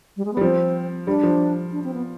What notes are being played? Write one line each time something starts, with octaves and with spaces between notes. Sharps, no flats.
G3
G#3
B3
G3
F3 C4
G3 D4
F3
D4
C4
B3